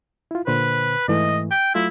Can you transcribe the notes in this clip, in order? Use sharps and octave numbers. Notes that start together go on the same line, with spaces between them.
E4 F4
A#2 D3 B4 C5
G#2 E3 A3 D#5
G5
F#3 A3 E4 F4